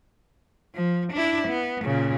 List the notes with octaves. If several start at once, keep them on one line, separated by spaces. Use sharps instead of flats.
F3
D4 E4
B3
A#2 C#3